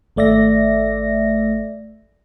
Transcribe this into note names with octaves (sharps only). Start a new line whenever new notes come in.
G#1 A3 D5 E5 A#6